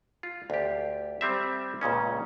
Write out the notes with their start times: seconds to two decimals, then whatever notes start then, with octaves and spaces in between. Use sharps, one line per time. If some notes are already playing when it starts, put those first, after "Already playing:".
0.23 F4
0.50 D2 G4
1.21 G3 C4 E5
1.81 C#2 A#2 C#3 C#4